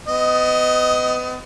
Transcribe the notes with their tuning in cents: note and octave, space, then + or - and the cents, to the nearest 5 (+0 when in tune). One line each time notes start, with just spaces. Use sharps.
B3 +35 D#5 +0